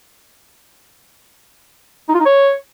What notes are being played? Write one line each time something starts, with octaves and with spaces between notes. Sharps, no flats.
D#4
F4
D#4
C#5